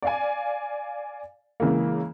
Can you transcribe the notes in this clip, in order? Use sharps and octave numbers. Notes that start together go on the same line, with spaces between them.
D5 F5 G#5
C#3 E3 G#3 A#3